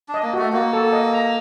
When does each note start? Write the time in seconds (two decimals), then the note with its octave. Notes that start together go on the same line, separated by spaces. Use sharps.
0.09 D4
0.14 D#5
0.23 A#3
0.33 A3 F#4
0.53 A#3 F#4
0.73 A4
0.93 D#5
1.13 A#5